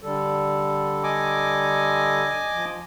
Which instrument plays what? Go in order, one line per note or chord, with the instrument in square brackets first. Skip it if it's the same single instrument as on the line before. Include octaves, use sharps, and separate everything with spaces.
[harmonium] D3 G3 A4
[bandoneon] D#5 G#5 D6
[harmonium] F3